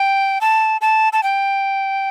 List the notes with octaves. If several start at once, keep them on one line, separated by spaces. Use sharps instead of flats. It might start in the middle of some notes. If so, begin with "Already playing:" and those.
Already playing: G5
A5
A5
A5
G5